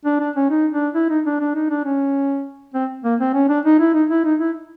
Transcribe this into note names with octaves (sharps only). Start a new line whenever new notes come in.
D4
D4
C#4
D#4
D4
E4
D#4
D4
D4
D#4
D4
C#4
C4
A#3
C4
C#4
D4
D#4
E4
D#4
E4
D#4
E4